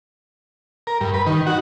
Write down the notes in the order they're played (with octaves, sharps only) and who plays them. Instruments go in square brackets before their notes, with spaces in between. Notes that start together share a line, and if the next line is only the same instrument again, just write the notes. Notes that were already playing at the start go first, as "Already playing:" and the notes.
[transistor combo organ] A#4
G2
B4
D#3
F#4